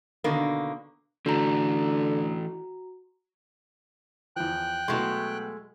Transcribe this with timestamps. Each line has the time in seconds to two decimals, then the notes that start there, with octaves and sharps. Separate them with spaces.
0.24 B2 D3 D#3 A#3
1.26 D3 E3 A3 F#4 A#5
4.36 E2 F3 G5 F#6
4.88 B2 F#3 G#3 A3 F#4